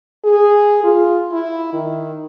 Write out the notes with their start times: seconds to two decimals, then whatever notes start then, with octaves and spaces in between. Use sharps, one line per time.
0.24 G#4
0.84 F4
1.32 E4
1.73 D#3